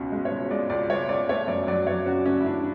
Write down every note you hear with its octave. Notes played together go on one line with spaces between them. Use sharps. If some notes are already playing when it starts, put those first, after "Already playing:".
Already playing: C#2 B2 C#4
G#3
C#5
B2
G#3 D5
C#2 D5
G#3 C#5
C#2 D5
A3 C#5
F#2 D5
F#3 D5
F#3 C#5
C#3 F#4
A3 C#4
E4
C#3 D4